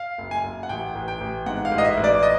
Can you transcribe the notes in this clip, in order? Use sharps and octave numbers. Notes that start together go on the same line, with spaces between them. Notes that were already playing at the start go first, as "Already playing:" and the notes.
Already playing: F5
F#1
G#5
F#1
F#5
A1 G5
A1
G5
A1
G#2 F#5
F5
A1
D#5
E5
A1
D5
D#5